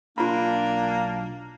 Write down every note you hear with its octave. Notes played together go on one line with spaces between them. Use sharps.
B1 A#3 D4 F4 B5